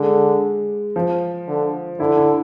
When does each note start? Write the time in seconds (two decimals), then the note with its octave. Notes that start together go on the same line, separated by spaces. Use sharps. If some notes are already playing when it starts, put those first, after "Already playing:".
Already playing: D3 G#3
0.96 F3
1.48 D3
2.00 D3 E4
2.17 E4